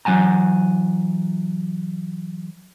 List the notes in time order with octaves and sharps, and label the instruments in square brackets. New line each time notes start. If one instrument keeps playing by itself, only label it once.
[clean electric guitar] E3 F#3 F#5 G#5 A#5